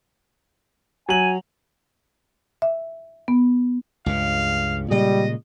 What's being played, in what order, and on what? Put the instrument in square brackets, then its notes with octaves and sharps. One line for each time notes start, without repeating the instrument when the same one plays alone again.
[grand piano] F#3 F#7 [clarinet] G#5
[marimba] E5
B3
[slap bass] C#2 G2 C#3 [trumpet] F5
[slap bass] A#2 C#3 G#3 [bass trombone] G3 [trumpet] D#5